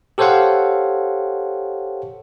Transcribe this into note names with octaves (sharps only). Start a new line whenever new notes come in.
G4 A4 C5 C#5 F5 F#5